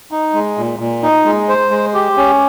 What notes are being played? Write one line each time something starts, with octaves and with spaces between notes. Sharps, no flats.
D#4
G#3
A#2
A#2
D#4
G#3
C5
G#3
G4
C#4